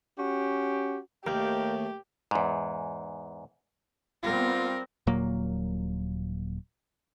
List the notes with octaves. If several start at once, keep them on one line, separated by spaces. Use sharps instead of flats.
C#4 F#4 G4
D#2 A3 G4 A#4 F5 G5
E2 G#2
G3 B3 C4 F4 A#4
D#1 A#2 F#3 A#3